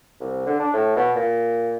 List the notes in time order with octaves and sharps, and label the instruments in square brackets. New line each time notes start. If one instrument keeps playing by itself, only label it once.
[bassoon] C2
D3
D4
A2
B2
A#2